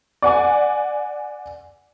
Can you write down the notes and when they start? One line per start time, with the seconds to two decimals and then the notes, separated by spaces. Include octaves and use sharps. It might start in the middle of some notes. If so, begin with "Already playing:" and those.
0.22 D5 F#5 G#5